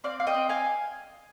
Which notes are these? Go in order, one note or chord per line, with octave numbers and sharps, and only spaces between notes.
C4 D5 F5
F5
D#5 G5
C4
F5 G#5